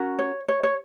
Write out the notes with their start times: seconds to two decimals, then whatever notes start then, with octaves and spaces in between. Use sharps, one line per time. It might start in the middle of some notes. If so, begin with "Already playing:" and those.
Already playing: C#4 F#4 A#4
0.19 C#5
0.48 C#5
0.63 C#5